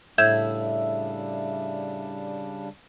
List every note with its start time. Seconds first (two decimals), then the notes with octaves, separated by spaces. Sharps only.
0.18 A2 C#3 G3 D4 E5 G6 G#6 E7